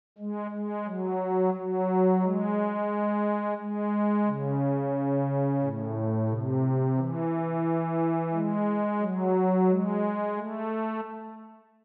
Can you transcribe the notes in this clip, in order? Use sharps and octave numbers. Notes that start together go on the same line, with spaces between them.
G#3
G#3
F#3
F#3
G#3
G#3
C#3
A2
C3
E3
G#3
F#3
G#3
A3